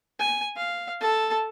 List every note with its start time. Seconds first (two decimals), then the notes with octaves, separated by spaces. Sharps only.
0.20 G#5
0.56 F5
1.00 A4 A5